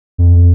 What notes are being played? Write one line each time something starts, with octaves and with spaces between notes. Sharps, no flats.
F2